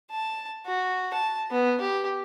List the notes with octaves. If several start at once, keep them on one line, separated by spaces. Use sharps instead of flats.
A5
F#4
A5
B3
G4